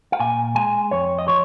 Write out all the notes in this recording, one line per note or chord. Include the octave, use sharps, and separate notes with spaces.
F5
A#2 G#5
G#3 G#5
F2 C#5
D#5
F3 C#5